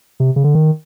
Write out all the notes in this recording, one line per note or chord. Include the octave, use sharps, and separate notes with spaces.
C3
C#3
D3
D#3